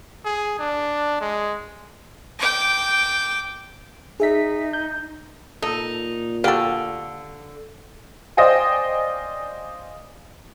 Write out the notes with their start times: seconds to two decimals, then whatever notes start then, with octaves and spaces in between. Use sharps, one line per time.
0.25 G#4
0.59 D4
1.21 G#3
2.39 G5 D6
4.20 D#4 G#4 E5 B6
4.73 G6
5.63 A#2 D#4 A4
6.44 D3 F#4 G4 A4 F5
8.37 C5 D5 D#5 F5 G5 G#5